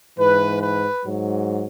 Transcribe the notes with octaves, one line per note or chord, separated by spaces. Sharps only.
G#2 E3 B4
B4
G#2 F#3